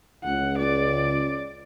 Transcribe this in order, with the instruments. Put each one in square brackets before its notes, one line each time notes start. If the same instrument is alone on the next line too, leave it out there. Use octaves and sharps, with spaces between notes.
[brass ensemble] C#2 [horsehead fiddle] F#5
[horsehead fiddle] D5